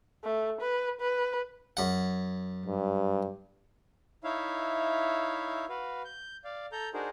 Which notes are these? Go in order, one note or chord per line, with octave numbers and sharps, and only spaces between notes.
A3
B4
B4
F#2 F#5
G2
D#4 E4 C#5 E5 F5
F#4 B4 F5
G6
D5 F5
A4 A#5 G6
D4 D#4 F#4 G#4 A#4 C5